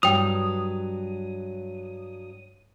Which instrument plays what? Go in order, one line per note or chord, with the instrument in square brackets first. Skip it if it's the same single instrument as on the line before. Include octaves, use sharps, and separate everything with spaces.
[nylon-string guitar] G2 F#3 [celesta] G5 F7 [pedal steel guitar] D#6